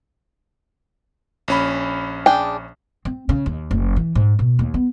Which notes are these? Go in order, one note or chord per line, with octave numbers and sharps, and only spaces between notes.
A#1 C#4 B5
D4 G#4 G5
C4
C#3
D#2
F#1
E3
G#2
B2
D#2
B3